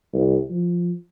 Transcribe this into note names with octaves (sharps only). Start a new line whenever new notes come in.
C2
F3